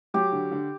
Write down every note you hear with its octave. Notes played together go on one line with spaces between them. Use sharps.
F#3 G4
D3
D3